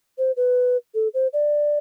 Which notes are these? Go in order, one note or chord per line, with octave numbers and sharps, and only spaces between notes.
C5
B4
A4
C5
D5